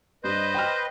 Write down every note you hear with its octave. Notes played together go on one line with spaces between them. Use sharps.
G2 B4 C5 D#5
G5 B5 F6